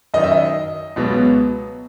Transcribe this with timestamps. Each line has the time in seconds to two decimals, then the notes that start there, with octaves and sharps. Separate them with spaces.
0.14 F#2 D#3 F#3 D#5
0.23 E5
0.32 D#5
0.96 C#2 B2 F#3 B3